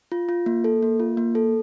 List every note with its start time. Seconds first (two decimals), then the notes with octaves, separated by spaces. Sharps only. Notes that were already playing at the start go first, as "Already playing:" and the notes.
0.12 F4
0.29 F4
0.46 A#3
0.64 A4
0.83 A#3
1.00 F4
1.17 A#3
1.35 A4